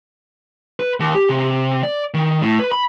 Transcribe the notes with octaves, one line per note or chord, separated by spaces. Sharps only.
B4
D#2
G4
C3
D5
D#3
A2
B4
B5